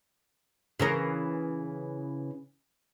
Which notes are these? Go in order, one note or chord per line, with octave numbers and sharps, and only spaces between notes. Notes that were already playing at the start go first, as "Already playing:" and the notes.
C#3 E3 A#4